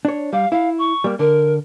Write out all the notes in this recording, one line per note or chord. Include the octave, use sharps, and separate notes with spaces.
D4 C#5
G3 F5
E4 F5
C#6
G3 A#3
D3 A#4